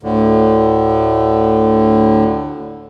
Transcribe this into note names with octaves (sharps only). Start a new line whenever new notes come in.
D2 A2 D3